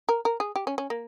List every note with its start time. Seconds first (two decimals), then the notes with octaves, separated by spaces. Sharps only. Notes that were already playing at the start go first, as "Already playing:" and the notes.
0.09 A#4
0.25 A#4
0.40 G#4
0.56 G4
0.67 C#4
0.78 C#4
0.90 A#3